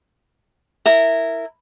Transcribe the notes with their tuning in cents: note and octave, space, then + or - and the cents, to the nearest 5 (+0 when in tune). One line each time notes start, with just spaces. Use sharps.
E4 +0 A#4 -15